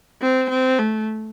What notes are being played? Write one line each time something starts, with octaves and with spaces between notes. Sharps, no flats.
C4
C4
A3